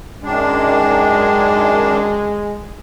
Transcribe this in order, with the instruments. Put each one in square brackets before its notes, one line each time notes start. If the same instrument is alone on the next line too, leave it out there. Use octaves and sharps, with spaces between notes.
[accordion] F#2 D#3 D4 [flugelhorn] G#3